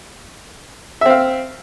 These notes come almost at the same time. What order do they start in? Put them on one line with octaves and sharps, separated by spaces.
E5 C4 F5